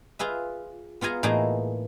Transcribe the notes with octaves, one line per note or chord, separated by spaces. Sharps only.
F4 G#4 B4 E5
B3 F4 G#4 G#5 A#5
A2 E3 A#3 D#4 G#4